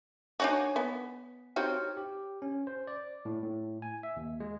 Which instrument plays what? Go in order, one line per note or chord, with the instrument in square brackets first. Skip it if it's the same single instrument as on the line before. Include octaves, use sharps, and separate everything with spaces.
[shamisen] D4 D#4 F#4 [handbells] C#5 G#5
[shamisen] B3 [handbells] B6
[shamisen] C4 D#4 F#4 [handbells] G4 C#5 F6
[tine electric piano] G4
C#4
C5
D5
A2
A2
G#5
E5
D#2
G#3